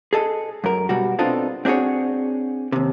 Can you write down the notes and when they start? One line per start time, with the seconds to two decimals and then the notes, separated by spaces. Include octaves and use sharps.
0.13 G#4 A4 D#5
0.64 F#2 A#4
0.89 B2 G3 F#4
1.19 B3 C4 D4 D#4 F4 A4
1.65 C4 D4 F#4 G#4 C#5
2.72 D#2 C3